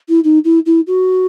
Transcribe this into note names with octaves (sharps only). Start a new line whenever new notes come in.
E4
D#4
E4
E4
F#4